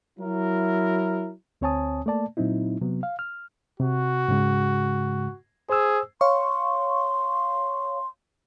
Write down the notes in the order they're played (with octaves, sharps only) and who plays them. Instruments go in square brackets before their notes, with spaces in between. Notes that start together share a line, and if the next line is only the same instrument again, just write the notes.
[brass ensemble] F#3 E4 A#4
[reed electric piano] D2 C4 C#5 G#5 A5 D#6
A3 A#3 D5 A5
A#2 F#3 C4 D#4 E4
C3 F#3 B3
F5
F6
[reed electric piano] C3 [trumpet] F#4
[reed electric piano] G#2 C#3 G#3
[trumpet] G#4 [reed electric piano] C5 E6
[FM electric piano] C#5 F5 C#6 [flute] C6